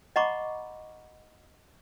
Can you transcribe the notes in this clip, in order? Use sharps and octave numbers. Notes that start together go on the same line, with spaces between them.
D#5 F#5 A#5 B5 C#6 D6